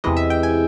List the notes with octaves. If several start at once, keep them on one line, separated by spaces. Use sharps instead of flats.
E2 C3 E3 G#3 D#5
E5
G5
G#5